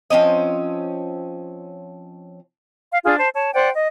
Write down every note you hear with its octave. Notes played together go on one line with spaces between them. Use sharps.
F3 C4 C#4 D#5
F5
D4 F4 G#4
C5 A5
C#5 A5
C5 D5 F#5 G5
D#5